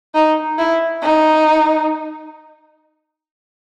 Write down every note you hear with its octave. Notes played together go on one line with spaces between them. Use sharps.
D#4
E4
D#4